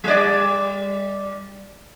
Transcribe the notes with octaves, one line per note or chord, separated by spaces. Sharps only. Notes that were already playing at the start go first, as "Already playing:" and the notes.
G3 D5